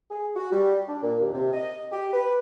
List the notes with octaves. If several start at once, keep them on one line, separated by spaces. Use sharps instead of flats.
G#4
F#4
G3
D4
A#2
D#2
C3
D#5
G4
B4